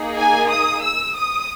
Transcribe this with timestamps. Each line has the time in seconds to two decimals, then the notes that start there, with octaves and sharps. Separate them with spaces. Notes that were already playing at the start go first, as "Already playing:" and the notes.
Already playing: A#3 D#4 G#4
0.17 G#5
0.50 D#6
0.83 E6
1.16 D#6